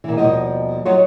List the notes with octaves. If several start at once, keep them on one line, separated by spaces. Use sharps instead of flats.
A#2 E3
D#2 B2 F3 G3 D#5
F#3 D#4 F4 F#4 C#5